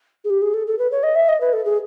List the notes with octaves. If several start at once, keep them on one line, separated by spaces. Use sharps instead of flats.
G#4
G4
G#4
A4
A4
B4
C#5
D#5
E5
D#5
B4
A4
G#4